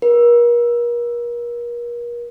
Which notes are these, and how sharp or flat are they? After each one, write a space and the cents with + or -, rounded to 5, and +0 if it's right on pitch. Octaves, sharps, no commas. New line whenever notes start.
A#4 +40